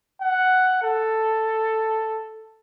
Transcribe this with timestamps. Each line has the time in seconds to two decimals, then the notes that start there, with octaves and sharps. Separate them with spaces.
0.22 F#5
0.82 A4